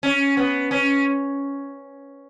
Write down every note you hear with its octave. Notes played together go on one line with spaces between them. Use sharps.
C#4
B3
C#4